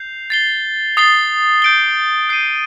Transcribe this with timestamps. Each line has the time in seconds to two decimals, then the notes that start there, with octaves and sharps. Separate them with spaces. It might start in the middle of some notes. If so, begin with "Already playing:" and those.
Already playing: G6 C7 F7
0.30 A6 C7 G7
0.97 D#6 A6 C7 G7
1.62 G6 D7 G7
2.29 G6 C7 D#7